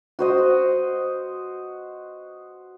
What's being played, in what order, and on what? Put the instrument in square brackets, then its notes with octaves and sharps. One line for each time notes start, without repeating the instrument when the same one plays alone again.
[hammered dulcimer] F#4 C5 D#5